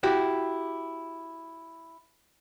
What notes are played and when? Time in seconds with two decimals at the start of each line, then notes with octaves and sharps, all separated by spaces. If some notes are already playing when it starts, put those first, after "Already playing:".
0.03 E4 F#4 G4